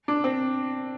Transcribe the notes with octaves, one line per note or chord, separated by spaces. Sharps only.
D4
C4